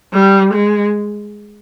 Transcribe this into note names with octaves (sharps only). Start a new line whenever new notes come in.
G3
G#3